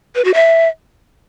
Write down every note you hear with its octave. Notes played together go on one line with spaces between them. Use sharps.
B4
F#4
E5